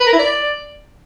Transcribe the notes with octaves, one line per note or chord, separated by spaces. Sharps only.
B4
A#4
E4
D5